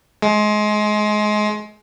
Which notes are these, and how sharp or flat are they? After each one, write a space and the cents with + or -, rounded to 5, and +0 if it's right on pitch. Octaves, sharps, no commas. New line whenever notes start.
G#3 +25